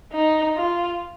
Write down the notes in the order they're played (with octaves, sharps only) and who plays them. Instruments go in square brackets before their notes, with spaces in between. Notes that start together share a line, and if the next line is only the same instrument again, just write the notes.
[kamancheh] D#4
F4